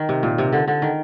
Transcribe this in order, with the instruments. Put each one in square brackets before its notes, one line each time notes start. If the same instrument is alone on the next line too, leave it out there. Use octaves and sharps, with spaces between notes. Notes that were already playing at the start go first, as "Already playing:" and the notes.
Already playing: [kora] D#3
C3
A#2
C3
D3
D3
D#3